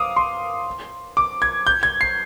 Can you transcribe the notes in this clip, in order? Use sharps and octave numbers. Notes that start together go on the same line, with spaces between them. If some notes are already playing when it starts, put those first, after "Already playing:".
Already playing: F5 D6 D#6
C6
D6
G#6
G6
G#6
C7